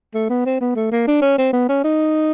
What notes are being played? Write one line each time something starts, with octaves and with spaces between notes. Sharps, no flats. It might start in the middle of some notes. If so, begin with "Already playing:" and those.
A3
B3
C4
B3
A3
A#3
D4
C#4
C4
B3
C#4
D#4